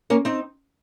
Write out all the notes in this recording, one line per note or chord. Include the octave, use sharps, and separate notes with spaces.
A#3 C#4
C4 D#4